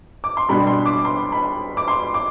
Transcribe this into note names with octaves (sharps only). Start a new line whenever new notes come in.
D6
C6
B2 G3 D4 B5
C6
D6
C6
B5
D6
C6
D6